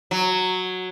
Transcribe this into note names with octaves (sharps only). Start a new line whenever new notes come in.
F#3